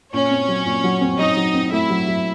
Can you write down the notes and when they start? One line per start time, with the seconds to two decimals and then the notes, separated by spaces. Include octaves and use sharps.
0.13 A#2 C#4 C#5
0.30 C4
0.48 F#3
0.66 A#2
0.84 F#3
1.01 C4
1.18 F#3 D#4 D#5
1.36 F#3
1.54 C4
1.72 A3 E4 E5
1.90 F#3
2.07 F#3